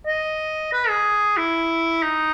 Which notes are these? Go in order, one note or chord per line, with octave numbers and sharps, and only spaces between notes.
D#5
B4
G#4
E4
D#4